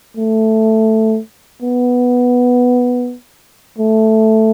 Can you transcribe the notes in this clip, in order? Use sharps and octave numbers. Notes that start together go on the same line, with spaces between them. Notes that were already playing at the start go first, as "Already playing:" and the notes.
A3
B3
A3